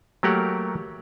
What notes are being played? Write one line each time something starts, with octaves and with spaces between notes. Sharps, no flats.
F#3 A3 A#3 G4 A#4 F#5